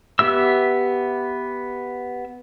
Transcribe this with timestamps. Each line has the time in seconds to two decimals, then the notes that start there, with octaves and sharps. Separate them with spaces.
0.19 B3 G4 E5 E6